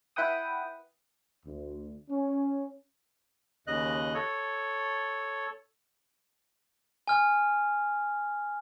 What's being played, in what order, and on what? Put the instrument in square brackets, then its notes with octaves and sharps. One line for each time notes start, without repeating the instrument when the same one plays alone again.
[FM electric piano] E4 B4 F#5 G5 D#6
[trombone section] D2
C#4
[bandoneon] D#2 C#3 D#5 F#6
A4 C#5
[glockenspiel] G#5 F6